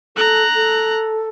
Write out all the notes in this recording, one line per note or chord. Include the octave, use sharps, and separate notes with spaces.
A4 A#5 F#6
A4